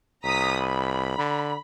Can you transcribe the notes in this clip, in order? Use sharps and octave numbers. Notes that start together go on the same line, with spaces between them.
C2 A#5 D#6 B6
B5
D3